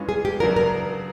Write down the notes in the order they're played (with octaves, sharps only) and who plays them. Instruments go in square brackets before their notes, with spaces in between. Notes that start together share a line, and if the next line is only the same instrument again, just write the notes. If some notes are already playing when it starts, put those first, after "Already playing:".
Already playing: [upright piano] G2 E3 G#3 C#4 F4
[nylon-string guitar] G#4
G4
[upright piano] F#2 C#3 F#3 B3 D4 [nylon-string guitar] A#4
[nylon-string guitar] A#4